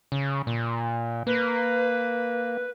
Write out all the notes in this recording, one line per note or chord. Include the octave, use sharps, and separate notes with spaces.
C#3
A#2
A#3 B4